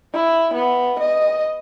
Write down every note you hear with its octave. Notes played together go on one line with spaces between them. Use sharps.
E4
B3
D#5